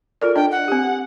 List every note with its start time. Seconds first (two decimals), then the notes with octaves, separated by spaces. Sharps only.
0.22 F4 A4 A#4 D5
0.36 D4 D#5 G5
0.51 F#5
0.68 C4 G4